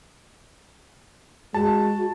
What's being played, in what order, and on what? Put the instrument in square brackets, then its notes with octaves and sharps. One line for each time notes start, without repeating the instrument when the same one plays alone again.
[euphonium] G#3 [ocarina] F#4 [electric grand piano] A5